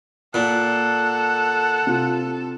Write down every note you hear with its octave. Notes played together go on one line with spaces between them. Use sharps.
A#2 A4 F#5
C3 F4